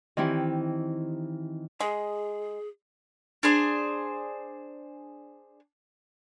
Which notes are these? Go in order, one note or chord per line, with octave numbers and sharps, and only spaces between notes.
D#3 E3 C4 D#4 E4 G4
G#3 G#4
D4 G#4 C5